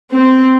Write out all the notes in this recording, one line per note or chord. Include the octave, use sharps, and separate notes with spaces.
C4